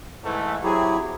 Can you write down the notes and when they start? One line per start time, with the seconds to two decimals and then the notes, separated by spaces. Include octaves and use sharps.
0.24 G#2 E3 A3
0.64 F#3 C4 E4 G4 G#4